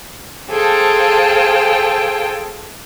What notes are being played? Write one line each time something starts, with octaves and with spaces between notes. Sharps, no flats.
G#4 A4 C5 F5 G5 A5